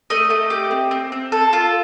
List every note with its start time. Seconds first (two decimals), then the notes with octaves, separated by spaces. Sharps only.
0.10 A3 D#5
0.30 A3
0.50 G4
0.71 C4
0.91 C4
1.12 C4
1.32 A4
1.53 F4